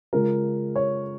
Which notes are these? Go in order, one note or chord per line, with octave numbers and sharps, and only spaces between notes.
C#3 G#3 C#4 F4 A#4
C#5